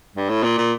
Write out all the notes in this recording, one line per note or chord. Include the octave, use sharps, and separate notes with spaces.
G2
A2
A#2
A#2